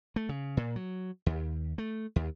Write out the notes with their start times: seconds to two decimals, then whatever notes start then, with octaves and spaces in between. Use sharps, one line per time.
0.16 A3
0.29 C#3
0.57 A#2
0.76 F#3
1.26 D#2
1.78 A3
2.16 D#2